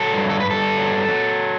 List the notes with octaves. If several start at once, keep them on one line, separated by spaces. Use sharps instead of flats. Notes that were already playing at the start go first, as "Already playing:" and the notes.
Already playing: F#3 A4
G2
A4
G2 B4
A4
F#3
F#3